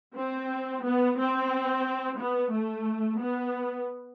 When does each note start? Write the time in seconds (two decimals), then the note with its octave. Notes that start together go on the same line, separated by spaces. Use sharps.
0.17 C4
0.84 B3
1.18 C4
2.19 B3
2.52 A3
3.19 B3